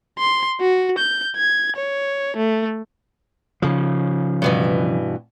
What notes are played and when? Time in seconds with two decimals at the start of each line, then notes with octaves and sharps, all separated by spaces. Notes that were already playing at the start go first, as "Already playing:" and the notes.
0.19 C6
0.60 F#4
0.98 G6
1.37 G#6
1.76 C#5
2.37 A3
3.62 C#3 F3
4.42 G2 B2 E3